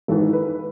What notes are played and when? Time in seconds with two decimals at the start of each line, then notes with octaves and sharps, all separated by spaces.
0.08 G#1 G#2 E3 A4
0.33 B4